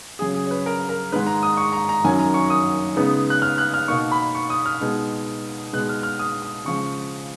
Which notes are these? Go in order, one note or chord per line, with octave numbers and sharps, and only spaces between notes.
C#3 F#3 C#4 G#4
G#4
C#5
B4
A#4
A#4
G#2 D#3 G#3 D#4 B4
A#5
D#6
C#6
A#5
A#5
F#2 D#3 F#3 C#4 G#5
A#5
C#6
D#6
C#3 G#3 B3 D#4
F#6
F6
F#6
F6
B2 A#3 D#4 C#6
B5
C#6
D#6
F6
B2 G#3 B3 D#4
B2 G#3 B3 D#4 F#6
F6
F6
D#6
D#6
C#3 F3 G#3 C#6